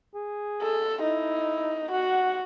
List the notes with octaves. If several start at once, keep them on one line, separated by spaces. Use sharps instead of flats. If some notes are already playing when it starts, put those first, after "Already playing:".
G#4
A4
D#4 E4
F#4 F#5